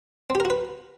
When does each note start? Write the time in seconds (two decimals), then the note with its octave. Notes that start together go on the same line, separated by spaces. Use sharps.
0.30 C4
0.35 G4
0.40 A#4
0.45 F#4
0.50 B4